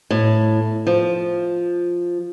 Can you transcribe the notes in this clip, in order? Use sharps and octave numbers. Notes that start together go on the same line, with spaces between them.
A2
F3